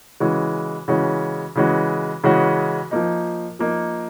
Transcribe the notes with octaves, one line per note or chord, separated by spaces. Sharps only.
C#3 E3 G#3 C#4 F#4
C#3 E3 G#3 C#4 F#4
C#3 E3 G#3 C#4 F#4
C#3 E3 G#3 C#4 F#4
F3 A#3 D#4
F3 A#3 D#4